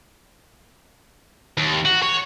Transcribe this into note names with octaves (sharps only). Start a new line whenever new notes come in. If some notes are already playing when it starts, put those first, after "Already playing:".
D#2
F#4
C#5